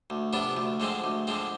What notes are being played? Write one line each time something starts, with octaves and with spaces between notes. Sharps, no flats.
D2
C3 F3 B3 D4
D2
D3 F3 G#3 C4
D2
D3 F3 G#3 C4